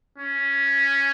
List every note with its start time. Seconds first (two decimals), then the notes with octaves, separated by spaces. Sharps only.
0.18 C#4